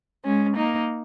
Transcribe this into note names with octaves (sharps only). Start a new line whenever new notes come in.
G#3 C#4
A#3 D#4